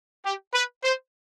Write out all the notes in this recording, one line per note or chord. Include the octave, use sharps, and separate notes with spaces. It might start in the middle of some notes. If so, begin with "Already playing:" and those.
G4
B4
C5